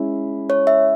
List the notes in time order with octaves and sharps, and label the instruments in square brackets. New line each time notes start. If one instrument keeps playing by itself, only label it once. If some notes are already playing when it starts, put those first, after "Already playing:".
Already playing: [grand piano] G#3 C#4 E4
[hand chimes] C#5
E5